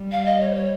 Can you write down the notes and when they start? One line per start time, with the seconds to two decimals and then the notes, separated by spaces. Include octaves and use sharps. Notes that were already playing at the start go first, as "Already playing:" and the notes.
Already playing: G3
0.12 F5
0.25 D#5
0.40 C#5
0.50 C5
0.55 C#5